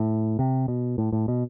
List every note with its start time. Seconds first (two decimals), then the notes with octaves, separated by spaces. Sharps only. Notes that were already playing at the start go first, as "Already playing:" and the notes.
Already playing: A2
0.39 C3
0.68 B2
0.98 A2
1.13 A2
1.28 B2